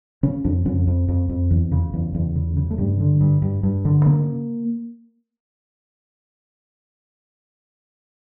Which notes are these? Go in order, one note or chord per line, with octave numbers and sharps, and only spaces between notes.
C#3 C#4
F2 D4
F2 C#4
F2
F2
F2
E2
C#3
E2
E2
C#3
C#3
A3
G2 G3
D3
G2
G2
G2
D3
C#3 A#3